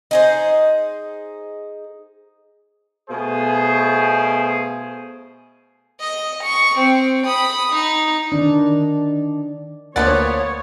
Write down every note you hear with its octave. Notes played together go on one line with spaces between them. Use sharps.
D#4 G#4 C5
B2 A3 F4 G#4 C5
D#5
C#6
C4
B5 D#6
D#4
D#3 D4
D2 F3 A#3 B3 C#5 D5 F#5 A6